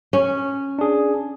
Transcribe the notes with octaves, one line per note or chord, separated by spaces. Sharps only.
C#4
D4 G#4